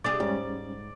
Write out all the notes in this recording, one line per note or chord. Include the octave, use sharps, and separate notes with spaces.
G3 D4 G#4 D5
G#2 G3 G#3 C#4